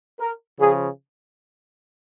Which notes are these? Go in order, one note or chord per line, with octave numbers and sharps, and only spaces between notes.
A#4
C#3 F3 G#4